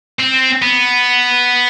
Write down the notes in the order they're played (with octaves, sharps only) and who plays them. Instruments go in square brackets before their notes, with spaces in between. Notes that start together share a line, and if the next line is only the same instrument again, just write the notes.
[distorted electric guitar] C4
B3